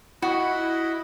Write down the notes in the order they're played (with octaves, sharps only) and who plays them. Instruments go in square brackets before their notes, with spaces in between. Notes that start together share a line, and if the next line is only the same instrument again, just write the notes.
[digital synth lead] E4 [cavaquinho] F#4 [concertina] D#5 F#5 B5